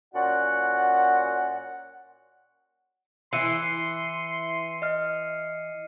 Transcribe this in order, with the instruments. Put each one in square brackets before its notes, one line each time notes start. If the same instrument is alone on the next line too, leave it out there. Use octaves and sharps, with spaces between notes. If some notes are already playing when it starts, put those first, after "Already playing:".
[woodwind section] A#2 C#4 F#4 D5 F#5
[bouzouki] E3 [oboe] C6 [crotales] C7 C#7 D#7
[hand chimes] D#5 F6